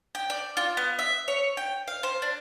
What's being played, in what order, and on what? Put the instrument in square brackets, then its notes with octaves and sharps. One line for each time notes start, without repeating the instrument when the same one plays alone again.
[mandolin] G5
D5
F4
B3
E5
C#5
G5
F5
C5
D4